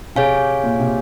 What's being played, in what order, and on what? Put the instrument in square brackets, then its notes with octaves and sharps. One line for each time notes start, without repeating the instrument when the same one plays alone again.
[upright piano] C3 [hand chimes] G#4 C#5 F5 G#5
[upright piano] A#2
C3